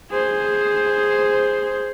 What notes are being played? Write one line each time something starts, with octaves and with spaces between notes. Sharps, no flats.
G#4 C5